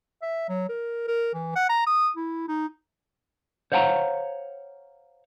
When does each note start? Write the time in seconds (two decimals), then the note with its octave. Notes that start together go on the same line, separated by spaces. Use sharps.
0.22 E5
0.49 F#3
0.69 A#4
1.08 A#4
1.34 E3
1.56 F#5
1.69 A#5
1.87 D#6
2.17 E4
2.48 D#4
3.72 C5 C#5 F5 F#5 A5 A#5